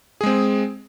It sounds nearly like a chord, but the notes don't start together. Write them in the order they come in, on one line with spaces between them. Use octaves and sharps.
G#4 G#3 C4